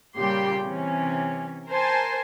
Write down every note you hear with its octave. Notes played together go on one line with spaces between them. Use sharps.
A#2 C#3 G3 G4 G5 C6
C3 E3 C#4
A#4 C5 G#5 A5